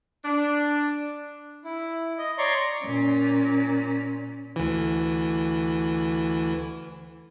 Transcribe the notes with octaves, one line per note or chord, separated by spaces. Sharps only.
D4
E4
D#5
C#5 D5 A#5 C6 C#6
A#2 C#4
D2 E3